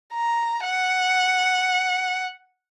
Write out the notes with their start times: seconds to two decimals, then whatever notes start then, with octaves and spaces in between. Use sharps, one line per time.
0.13 A#5
0.66 F#5